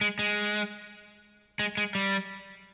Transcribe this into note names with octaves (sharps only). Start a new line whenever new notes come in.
G#3
G#3
G#3
G#3
G3